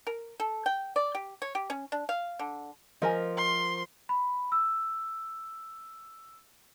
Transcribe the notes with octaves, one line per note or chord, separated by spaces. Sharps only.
A#4
A4
G5
D5
G4
C#5
G4
C#4
D4
F5
D3
F3 A#4 D#5 G#5
C6
B5
E6